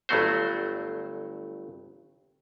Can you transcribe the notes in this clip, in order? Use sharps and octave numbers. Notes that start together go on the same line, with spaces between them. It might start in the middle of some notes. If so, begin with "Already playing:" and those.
G1 G2 F#3 A3 F#4 C5